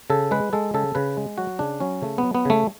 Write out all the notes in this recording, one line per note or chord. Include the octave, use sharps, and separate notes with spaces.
C#3 A4
G#3 B4
G#3 A4
C#3 A4
C#3 B4
G#3
F#3 F#4
C#3 D4
F#3 C#4
C#3 A3
B3
F#3
B3
C#3 A3